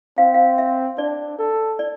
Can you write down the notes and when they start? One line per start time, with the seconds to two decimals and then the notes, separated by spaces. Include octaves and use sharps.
0.18 C4 F5
0.34 F5
0.58 E5
0.98 D4 D5
1.39 A4
1.79 D5